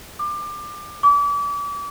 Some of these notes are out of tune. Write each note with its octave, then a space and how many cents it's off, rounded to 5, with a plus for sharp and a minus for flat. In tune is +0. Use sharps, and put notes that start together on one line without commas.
D6 +25
D6 -35